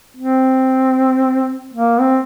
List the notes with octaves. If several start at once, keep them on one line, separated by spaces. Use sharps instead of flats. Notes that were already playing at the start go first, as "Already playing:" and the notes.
C4
A#3
C4